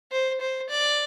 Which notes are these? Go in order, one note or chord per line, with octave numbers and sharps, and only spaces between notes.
C5
C5
D5